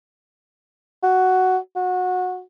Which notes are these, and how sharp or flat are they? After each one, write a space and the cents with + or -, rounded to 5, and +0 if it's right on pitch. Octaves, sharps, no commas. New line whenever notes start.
F#4 +5
F#4 -20